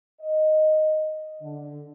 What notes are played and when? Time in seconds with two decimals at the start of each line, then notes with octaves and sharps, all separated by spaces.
0.21 D#5
1.42 D3